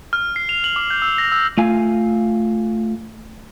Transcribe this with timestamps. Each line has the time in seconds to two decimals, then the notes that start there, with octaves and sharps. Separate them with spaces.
0.13 F6
0.36 C7
0.49 F7
0.64 F#7
0.76 D6
0.90 G6
1.02 E6
1.18 A#6
1.32 E6
1.58 A3 F4 F5 G#5